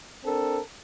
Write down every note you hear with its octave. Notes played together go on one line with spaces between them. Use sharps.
C4 D4 A4 A#4